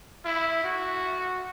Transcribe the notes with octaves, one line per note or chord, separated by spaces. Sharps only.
E4
F#4